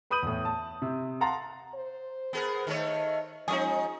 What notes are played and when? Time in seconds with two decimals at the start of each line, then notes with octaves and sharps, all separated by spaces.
0.10 B4 B5 D#6 G6 D#7 F#7
0.22 E2 A2
0.45 A5
0.82 C3
1.21 F5 F#5 A5 A#5 C6 A6
1.75 C5
2.33 B3 G#4 A#4
2.67 D#3 A3 C#5
3.48 F3 G#3 C#4 D#4 G#4